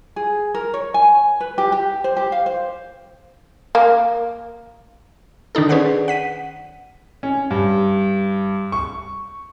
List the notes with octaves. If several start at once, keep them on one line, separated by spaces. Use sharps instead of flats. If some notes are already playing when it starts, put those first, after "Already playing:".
G#4
A#4
C#5
G#5
B4
G4
G4
C5
G4
F5
C5
A#3
D#3 D4 D#4 A4
C#4 G#4 B4 C5 D5 F#5
F#5 B6 D#7
C#4
G2
C#6